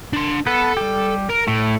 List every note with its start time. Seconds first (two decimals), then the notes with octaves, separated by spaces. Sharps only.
0.13 D4 C6
0.47 B3 A4 B4
0.77 G3 G4
1.30 A#4
1.48 A2 A3